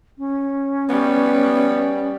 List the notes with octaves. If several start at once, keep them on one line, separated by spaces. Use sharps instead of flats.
C#4
G3 B3